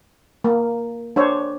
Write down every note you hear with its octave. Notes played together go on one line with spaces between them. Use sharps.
A#3
D4 C5 C#5